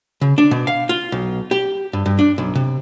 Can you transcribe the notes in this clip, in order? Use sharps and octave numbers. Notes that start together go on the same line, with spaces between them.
C#3
D4
B2
F5
F4
B1
G4
G2
G2
D4
B1
C3